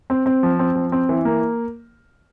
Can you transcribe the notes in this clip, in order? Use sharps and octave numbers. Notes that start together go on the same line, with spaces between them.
C4
C4
F3
C4
F3
C4
E3
A#3